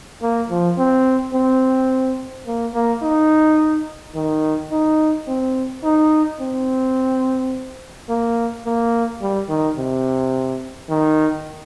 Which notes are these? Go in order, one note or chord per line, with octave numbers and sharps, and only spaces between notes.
A#3
F3
C4
C4
A#3
A#3
D#4
D#3
D#4
C4
D#4
C4
A#3
A#3
G3
D#3
C3
D#3